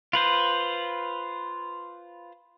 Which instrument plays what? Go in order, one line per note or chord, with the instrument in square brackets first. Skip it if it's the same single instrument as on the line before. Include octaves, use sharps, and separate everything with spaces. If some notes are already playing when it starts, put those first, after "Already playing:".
[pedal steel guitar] F4 B4 C5